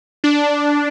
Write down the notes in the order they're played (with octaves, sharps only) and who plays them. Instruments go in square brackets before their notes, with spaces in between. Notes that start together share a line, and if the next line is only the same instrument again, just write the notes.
[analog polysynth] D4